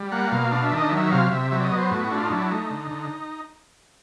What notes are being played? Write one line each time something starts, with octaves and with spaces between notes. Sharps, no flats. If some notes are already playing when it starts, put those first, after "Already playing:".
Already playing: G3
A#3 F#5
B2 F5
D4 F5
E5
D#3 D#5
F#3 E5
C3 F5
C3 E5
F#3 E5
D5
D#5
B3
C5
A2 F#4
F#4
D4 E4
F4
D#4
F#3 E4
A3 D#4
D3
D3